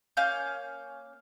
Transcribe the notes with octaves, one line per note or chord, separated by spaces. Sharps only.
A#3 C#4 F5 G6